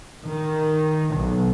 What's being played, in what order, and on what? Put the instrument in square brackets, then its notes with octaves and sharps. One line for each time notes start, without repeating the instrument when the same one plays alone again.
[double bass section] D#3
B1